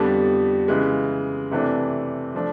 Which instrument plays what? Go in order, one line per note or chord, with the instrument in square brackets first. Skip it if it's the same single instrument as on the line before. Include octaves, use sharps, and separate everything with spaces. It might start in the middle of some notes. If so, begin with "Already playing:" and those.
Already playing: [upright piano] F2 D3 G3 B3 D4
C#3 E3 G#3
C3 E3 A3 D4
F3 A3 D4